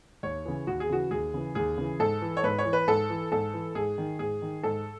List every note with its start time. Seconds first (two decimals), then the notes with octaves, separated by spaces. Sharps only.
0.23 D#2 C#5
0.45 C#3 E3
0.67 D#2 F#4
0.80 G#4
0.89 C#3 E3 F#4
1.11 D#2 G#4
1.34 C#3 E3
1.55 D#2 G#4
1.78 C#3 E3
2.00 G#2 A4
2.22 E3
2.37 C#5
2.43 G#2 B4
2.58 C#5
2.65 E3
2.73 B4
2.88 G#2 A4
3.10 E3
3.32 G#2 A4
3.54 E3
3.75 G#2 G#4
3.98 D#3
4.19 G#2 G#4
4.42 D#3
4.63 G#2 A4